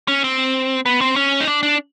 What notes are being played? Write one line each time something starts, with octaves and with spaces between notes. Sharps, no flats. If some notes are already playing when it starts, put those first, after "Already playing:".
C#4
C4
B3
C4
C#4
D#4
D4
D4